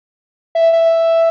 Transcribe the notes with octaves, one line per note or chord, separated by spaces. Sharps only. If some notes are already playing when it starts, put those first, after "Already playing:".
E5
E5